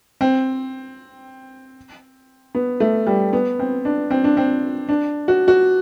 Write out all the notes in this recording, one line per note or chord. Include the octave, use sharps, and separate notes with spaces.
C4
B3
A3
G3
B3
C4
D4
C4
D4
C4
D4
F#4
F#4